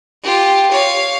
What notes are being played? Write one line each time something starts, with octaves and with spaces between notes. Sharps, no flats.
F4 G4
C#5 F5